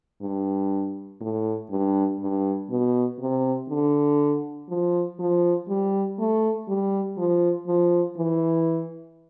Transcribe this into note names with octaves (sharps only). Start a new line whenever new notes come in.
G2
A2
G2
G2
B2
C3
D3
F3
F3
G3
A3
G3
F3
F3
E3